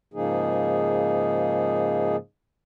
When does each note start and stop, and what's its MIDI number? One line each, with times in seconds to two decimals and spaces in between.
0.14 2.16 44
0.14 2.16 49
0.14 2.16 53
0.14 2.16 58
0.14 2.16 63
0.14 2.16 68